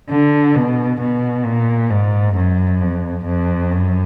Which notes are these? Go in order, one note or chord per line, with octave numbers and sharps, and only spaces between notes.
D3
B2
B2
A#2
G#2
F#2
F2
F2
F#2